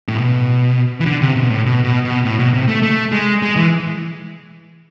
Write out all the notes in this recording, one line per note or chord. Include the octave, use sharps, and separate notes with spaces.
A2
B2
E3
D3
C3
B2
A2
B2
B2
B2
A2
B2
C3
A3
A3
G#3
G#3
E3